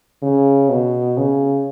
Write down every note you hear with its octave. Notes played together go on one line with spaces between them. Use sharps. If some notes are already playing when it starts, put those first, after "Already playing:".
C#3
B2
C#3